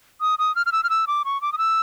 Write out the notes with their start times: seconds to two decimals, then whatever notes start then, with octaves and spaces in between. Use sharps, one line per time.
0.21 D#6
0.39 D#6
0.56 F6
0.66 F6
0.72 E6
0.84 F6
0.90 E6
1.07 D6
1.25 C#6
1.42 D6
1.53 D#6
1.58 E6